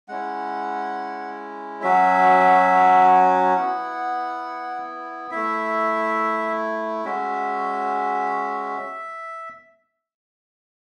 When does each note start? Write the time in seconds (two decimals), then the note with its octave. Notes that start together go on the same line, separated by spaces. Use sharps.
0.08 G#3 C#4 E4 F#5
1.82 F#3 C#4 F#4 E5
3.57 B3 E4 F#5
5.31 A3 E4 E5
7.05 G#3 C#4 F#4 E5